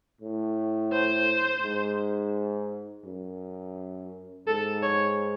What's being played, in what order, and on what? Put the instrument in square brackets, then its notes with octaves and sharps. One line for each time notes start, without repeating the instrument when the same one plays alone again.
[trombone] A2
[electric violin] C5
[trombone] G#2
F#2
[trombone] G#2 [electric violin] A4
[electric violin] C#5